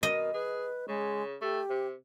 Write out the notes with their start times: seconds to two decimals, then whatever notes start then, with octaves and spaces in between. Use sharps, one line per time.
0.03 B2 A#4 D#5
0.34 G#4 B4
0.88 C#3 G#3
1.41 A3 G4
1.70 C3